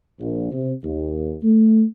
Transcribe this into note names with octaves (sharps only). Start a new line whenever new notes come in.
A#1
C3
D#2
A3